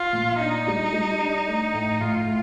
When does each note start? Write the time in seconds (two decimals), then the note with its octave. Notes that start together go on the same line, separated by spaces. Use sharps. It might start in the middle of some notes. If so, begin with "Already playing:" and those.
Already playing: F4
0.13 A#2
0.40 D4 D#4
0.67 G3
0.93 G3
1.20 D4
1.47 A3
1.74 A2
2.00 A2 F4
2.27 A2